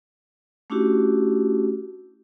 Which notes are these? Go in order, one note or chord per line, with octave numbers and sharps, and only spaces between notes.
A3 C#4 D4 E4 F#4 G4